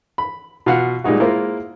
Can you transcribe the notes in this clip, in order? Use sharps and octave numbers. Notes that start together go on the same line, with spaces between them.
B5
B2 F4 F5 F#5
A#2 G3 G#3 D#4 F#4
G#3 A#3 E4 F4 C5